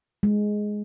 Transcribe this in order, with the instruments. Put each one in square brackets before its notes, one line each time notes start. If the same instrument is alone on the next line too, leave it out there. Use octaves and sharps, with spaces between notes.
[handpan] G#3